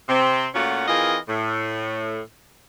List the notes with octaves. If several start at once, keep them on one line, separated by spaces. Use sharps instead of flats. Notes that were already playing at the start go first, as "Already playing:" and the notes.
C3 C4
A#2 A3 C#4 F4 F#4
E3 C4 F4 G#4 A#4 D#5
A2